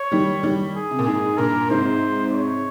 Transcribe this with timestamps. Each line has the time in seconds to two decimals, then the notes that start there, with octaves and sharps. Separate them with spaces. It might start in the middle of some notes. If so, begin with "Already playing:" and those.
Already playing: C#5
0.12 D#3 G3
0.43 D#3 G3
0.76 G#4
0.91 C3
0.99 A#2
1.06 G#2 G#4
1.38 G2 A#2 A#4
1.70 G#2 C3 C5
2.32 C#5